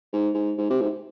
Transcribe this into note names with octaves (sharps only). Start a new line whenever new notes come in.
G#2
G#2
G#2
C3
G#2